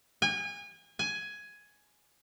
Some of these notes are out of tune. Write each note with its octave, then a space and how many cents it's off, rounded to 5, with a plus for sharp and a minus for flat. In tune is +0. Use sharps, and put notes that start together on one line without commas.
G#5 -35
G#5 +10